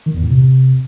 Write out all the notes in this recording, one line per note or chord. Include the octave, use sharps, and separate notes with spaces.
D#3
E2
A2
C3